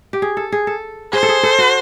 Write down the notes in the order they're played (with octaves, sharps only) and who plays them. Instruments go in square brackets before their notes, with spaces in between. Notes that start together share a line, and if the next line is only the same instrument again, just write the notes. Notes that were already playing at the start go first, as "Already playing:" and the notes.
[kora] G4
G#4
A4
G#4
A4
[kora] G#4 [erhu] C5
[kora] A4
G#4
A4
F#4